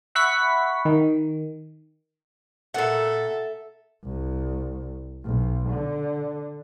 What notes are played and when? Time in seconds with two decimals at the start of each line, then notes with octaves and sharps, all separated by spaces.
0.15 E5 F#5 B5 C#6 B6
0.85 D#3
2.74 A#2 A4 E5 F#5
4.04 C2
5.25 B1
5.70 D3